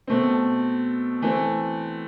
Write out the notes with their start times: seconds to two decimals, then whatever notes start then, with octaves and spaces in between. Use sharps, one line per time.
0.07 B2 A3 C4
1.22 E3 A3 C4